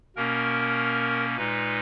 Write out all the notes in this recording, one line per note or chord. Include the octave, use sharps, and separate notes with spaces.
B2 A#3 C#4 A#4
A#2 G#3 D#4 B4